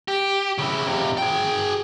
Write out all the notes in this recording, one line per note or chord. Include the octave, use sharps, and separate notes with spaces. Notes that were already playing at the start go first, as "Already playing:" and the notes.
G4
C#3 E4
F2 C3
G#4 G5